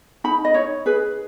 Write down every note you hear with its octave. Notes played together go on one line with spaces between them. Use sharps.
D#4 B5
D#5
D#4 C#5
G#4 B4